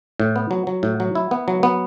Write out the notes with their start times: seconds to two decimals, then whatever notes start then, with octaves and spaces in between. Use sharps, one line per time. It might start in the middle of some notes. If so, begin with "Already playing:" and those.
0.20 A2
0.36 B3
0.51 F#3
0.67 F#3
0.83 A2
1.00 F#3
1.15 E4
1.31 B3
1.48 F#3
1.63 B3